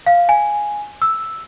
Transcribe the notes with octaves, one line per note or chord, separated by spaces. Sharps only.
F5
G#5
E6